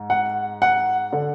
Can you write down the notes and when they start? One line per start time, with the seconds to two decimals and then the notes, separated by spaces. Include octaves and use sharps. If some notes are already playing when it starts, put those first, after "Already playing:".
Already playing: G#2
0.10 F#5
0.62 F#5
1.13 D3